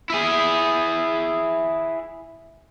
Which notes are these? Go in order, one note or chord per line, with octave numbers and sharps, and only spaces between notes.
E4 G#4